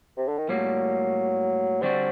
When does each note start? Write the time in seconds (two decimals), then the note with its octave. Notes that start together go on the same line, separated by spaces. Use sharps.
0.17 C3
0.28 D3
0.38 D#3
0.49 A2 F#3 G3 A#3
1.82 D3 G3 C4 D4 F#4